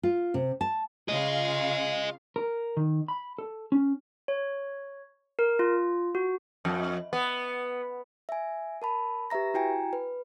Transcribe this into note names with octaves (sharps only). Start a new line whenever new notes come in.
F4
C3
A5
C#3 F4 G#4 D#5 F5
A#4
D#3
B5
A4
C#4
C#5
A#4
F4
F#4
F2
B3
E5 G#5
A#4 A5 B5
G4 B4 E5 A#5 A#6
E4 F#4 G5 G#5 A#5
B4